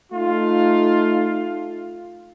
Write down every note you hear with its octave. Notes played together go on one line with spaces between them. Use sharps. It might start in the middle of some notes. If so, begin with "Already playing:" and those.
A3 D#4 F4